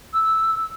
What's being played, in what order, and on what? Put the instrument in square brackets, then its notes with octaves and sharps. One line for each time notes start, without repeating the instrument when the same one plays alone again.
[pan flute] E6